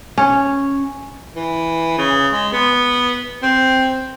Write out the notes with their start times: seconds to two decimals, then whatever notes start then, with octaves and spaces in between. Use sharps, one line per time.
0.18 C#4
1.36 E3
1.98 C#3
2.32 G#3
2.53 B3
3.42 C4